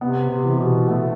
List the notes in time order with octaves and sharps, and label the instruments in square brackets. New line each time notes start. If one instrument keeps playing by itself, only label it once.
[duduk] C3 [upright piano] B3
[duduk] C3
[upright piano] E3
[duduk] B2
[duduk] A3 [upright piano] B3